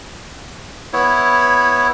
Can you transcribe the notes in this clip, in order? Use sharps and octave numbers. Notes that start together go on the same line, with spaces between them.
B3 E4 C#5